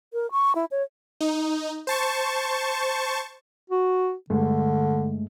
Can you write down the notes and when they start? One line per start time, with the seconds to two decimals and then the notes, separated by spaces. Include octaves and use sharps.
0.13 A#4
0.32 C#6
0.55 E4
0.71 C#5
1.21 D#4
1.87 C5 A5 C#6
3.70 F#4
4.30 G2 D3 G#3 A3